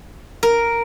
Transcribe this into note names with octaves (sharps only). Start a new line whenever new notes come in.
A#4